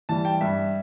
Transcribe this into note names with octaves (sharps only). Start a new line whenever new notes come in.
E3 G3 A5
G5
G2 E5